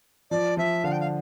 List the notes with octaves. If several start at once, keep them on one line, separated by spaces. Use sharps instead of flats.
F3 D5
F3 E5
D3 F5
G5
F5